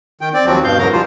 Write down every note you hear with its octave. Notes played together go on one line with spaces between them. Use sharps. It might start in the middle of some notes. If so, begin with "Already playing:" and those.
D#3 G5
C4 D5
D#2 F3 F#3 C4
G2 B2 F5 G6
E2 G#2 C#3 F#3 A#4
E3 F3 G3 F4 C5